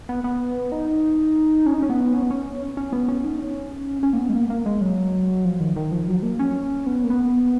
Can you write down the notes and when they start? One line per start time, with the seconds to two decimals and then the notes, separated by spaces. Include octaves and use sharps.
0.09 B3
0.24 B3
0.72 D#4
1.66 C#4
1.74 D#4
1.82 C#4
1.90 B3
2.14 C#4
2.22 B3
2.31 C#4
2.77 C#4
2.92 B3
3.08 C#4
3.24 D#4
3.39 C#4
4.03 C#4
4.13 A#3
4.18 B3
4.29 G#3
4.34 A#3
4.50 A#3
4.66 G#3
4.81 F#3
5.45 F3
5.60 D#3
5.76 D#3
5.92 F3
6.08 F#3
6.23 A#3
6.39 C#4
6.86 B3
7.04 A#3
7.10 B3